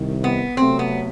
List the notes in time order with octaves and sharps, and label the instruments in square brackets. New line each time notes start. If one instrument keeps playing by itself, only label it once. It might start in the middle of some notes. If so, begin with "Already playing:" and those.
Already playing: [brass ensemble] C2 C3 D#3
[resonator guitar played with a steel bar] B3
[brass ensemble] C3 F#3 A3 [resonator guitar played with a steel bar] C4
[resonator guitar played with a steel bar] B3